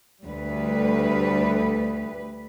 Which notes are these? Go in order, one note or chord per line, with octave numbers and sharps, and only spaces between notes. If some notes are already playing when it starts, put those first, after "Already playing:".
D2 G3 A3 B4